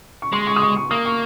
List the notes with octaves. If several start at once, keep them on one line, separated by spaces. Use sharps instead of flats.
C#6
G#3 C6
C#6
D#6
C#6
C#6
A#3 D#6
C#6